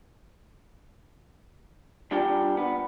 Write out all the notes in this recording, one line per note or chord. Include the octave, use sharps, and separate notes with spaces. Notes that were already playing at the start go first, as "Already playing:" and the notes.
G3 D4 F4 G5
B3